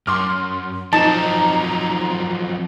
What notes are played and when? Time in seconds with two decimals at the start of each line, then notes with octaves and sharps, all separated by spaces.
0.07 F#2 C6 D6 F6
0.93 F3 F#3 C4 D#4 A5 A#5